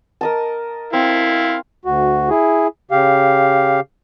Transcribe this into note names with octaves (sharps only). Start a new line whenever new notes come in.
A#4 D#5 A5
C4 E4 F5
D2 F#4
E4 G#4
C#3 G4 F5